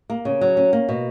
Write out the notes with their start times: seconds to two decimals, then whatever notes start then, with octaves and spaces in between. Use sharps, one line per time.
0.10 A#3
0.25 C#3
0.41 F#3
0.57 C#4
0.73 A#3
0.89 B2